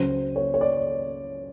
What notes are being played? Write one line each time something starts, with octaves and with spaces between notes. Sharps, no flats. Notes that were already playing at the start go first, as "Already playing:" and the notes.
Already playing: C#2 C#3 F#3 C5
C#5
C#5
D5